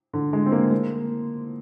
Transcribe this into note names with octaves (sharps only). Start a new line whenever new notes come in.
D3
G#3
C4
A#3
A#3